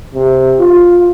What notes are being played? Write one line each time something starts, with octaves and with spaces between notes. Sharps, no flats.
C3
F4